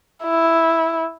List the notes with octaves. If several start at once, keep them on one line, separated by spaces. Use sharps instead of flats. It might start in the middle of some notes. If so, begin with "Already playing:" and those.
E4